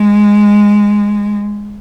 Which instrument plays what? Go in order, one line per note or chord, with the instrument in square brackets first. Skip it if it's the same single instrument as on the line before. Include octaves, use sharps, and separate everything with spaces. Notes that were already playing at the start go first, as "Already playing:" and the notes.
Already playing: [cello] G#3